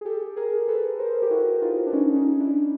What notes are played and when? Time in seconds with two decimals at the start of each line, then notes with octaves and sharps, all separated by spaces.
0.01 G#4
0.05 G4 A4
0.36 G#4 A#4
0.68 A4 B4
0.99 A#4 C5
1.22 G4
1.30 E4 F#4
1.62 D#4 F4
1.86 D4
1.93 C#4 D#4
2.16 C#4 D#4
2.39 D4 E4